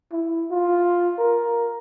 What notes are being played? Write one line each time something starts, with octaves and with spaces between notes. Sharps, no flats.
E4
F4
A#4